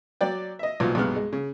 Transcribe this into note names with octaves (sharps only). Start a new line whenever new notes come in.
F#3 D5 G5
D#5 E5
B1 A#2 F3
B1 G2 G#3 B3 F6
G#3
C#3